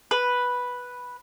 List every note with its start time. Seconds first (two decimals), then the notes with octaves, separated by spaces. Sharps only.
0.11 B4